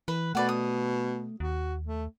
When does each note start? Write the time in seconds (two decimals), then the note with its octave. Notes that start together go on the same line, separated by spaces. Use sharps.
0.08 E3 B4
0.35 B2 A3 B4 D5 F#5
0.49 D#6
1.40 D#2 F#4
1.86 A3